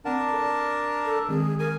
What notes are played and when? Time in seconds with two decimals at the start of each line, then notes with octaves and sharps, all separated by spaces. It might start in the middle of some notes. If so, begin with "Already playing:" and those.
0.05 C4 D4 A#4 F#5 A5
0.32 A4 D5
1.05 A4
1.29 D#3 G#3 C4 G#4
1.59 A#4 G#5